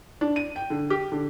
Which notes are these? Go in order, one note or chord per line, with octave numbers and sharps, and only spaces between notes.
D4
D#7
G5
D3
G4
D3